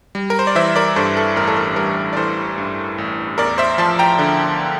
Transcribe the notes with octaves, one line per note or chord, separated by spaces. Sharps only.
G3
A#4
C5
D5
E3 C5 E5
A#4 D5
G2 A4 C5
A4
A1 A#4
A4
A#4
G3 A#4
D5
E3 A4 C5
G2
A1
E2 A#4 D5
C5 E5
F3 A5 C6
G5 A#5
D3